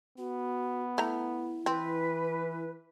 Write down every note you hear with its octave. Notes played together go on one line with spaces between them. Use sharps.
B3 F#4
A3 E4 A#5
E3 C4 B4